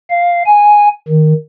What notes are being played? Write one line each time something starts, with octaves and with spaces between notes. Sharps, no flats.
F5
G#5
D#3